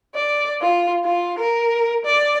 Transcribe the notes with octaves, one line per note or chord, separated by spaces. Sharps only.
D5
F4
F4
A#4
D5